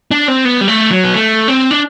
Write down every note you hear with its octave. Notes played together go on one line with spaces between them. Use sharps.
D4
C4
B3
G3
A3
F#3
B3
A3
C4
D4